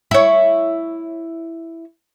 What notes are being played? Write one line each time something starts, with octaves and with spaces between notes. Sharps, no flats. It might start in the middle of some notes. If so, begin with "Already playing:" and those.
E4 C#5